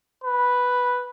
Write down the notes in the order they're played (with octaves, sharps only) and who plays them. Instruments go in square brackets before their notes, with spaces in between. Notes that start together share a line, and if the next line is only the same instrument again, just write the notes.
[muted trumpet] B4